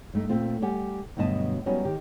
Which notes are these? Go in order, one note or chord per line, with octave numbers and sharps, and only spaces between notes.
G2 A3 D#4
A#2 A3 C4 F4
G3 G4 F#5 G#5
D2 G2 B2 F#3 D#5 A5
F#3 G3 B3 C#4 D#4 F#4
D#3 G4